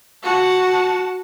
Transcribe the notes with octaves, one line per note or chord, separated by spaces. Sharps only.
F#4 A5